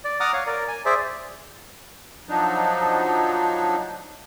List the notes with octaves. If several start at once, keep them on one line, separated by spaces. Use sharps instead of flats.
D5
F#5 A#5 D6 D#6 F6
C#5 F5
A#4 D5
G#5
G#4 C5 D5 E5
F3 F#3 D4 D#4